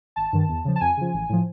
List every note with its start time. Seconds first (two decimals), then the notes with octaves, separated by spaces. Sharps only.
0.16 G#1 A5
0.33 G2 D#3
0.49 E2
0.65 C#3 F3
0.76 A5
0.81 F2 G#5
0.97 C#3 F3
1.13 A1
1.29 A2 F3